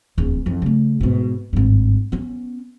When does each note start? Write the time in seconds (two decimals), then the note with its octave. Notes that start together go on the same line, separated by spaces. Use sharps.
0.18 D1 E2
0.46 F2 E3
0.62 C#3 A3
1.01 G#2 B2
1.53 G#1 G2
2.12 B3 C#4